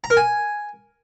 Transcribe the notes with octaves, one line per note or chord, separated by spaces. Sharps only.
A#5
A#4
G#5